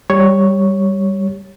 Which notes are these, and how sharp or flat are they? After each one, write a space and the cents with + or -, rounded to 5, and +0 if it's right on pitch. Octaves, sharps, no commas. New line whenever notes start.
G3 +0 C#5 +0